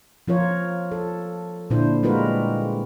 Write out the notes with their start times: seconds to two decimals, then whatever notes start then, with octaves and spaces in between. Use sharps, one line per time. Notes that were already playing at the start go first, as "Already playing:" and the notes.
0.28 F3 F4 A#4 C#5
0.91 A4
1.70 A#2 D3 D4 E4 C5
2.03 G3 G#3 F4 F#4 A#4 B4